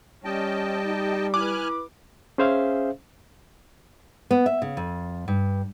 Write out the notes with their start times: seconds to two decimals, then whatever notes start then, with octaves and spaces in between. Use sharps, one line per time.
0.25 G3 C#4 D#5 G5 A5
0.85 D#4 G4
1.34 E4 B4 G#5 D6 F6 F#6
2.38 C#4 G#4 C5 E5 F5
4.31 B3
4.46 E5
4.62 C#3
4.77 F2
5.28 G2